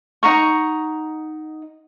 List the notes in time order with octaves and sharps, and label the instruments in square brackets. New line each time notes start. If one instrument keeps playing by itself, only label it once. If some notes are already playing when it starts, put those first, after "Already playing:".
[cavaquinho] D#4 F#5 A#5 C#6